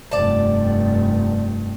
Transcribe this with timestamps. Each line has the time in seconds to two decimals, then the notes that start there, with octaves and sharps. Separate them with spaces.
0.11 F1 G2 D5 A5